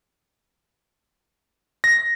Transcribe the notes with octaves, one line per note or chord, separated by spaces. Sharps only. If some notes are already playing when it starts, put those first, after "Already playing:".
A#6